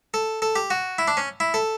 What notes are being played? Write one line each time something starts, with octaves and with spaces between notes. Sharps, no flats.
A4
A4
G4
F#4
E4
D4
C#4
E4
A4